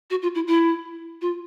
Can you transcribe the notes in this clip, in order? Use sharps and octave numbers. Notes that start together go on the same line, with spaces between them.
F#4
F4
E4
E4
F4